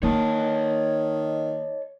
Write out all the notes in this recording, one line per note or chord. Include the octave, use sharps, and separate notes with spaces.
D#3 A#3 C#5 D#5 A5